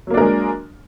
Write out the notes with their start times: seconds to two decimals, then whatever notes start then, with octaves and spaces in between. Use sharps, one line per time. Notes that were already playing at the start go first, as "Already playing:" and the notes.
0.07 F#3
0.10 A#3
0.14 D4
0.17 A#4
0.21 G#3